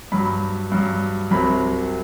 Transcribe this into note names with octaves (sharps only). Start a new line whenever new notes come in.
G2 F#3 B5
G2 F#3
C2 C3 F#3 B5